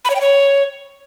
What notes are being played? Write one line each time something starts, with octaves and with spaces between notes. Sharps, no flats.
B5
C#5
G5
C#5